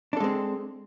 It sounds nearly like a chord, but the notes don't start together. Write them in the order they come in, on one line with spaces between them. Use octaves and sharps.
D4 A4 G#3 C4